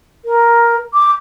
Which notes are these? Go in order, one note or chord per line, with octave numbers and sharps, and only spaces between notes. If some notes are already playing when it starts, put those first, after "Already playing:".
A#4
D6